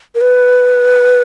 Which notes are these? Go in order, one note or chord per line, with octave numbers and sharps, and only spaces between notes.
A#4
B4